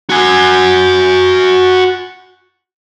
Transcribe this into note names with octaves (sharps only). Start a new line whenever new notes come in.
F#4 G#5